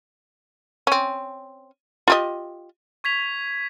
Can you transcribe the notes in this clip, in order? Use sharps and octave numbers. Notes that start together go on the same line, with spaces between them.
C4 C#4
F4 G4 D#5
C#6 G#6 B6 F7